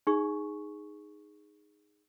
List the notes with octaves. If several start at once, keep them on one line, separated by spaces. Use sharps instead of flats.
D#4 G#4 C#6